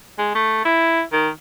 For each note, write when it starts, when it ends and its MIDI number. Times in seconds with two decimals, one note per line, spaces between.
0.18 0.30 56
0.35 0.61 57
0.65 1.02 64
1.13 1.29 51